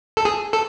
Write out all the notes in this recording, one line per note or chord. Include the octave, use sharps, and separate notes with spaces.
A4
G#4
A4